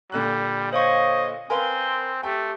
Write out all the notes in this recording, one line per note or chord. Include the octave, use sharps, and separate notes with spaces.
A#2 D3 G3 F#6
C5 C#5 D#5 F5 C#6
C4 A#4 B4 F5 G#5 C6
A3 G4 G5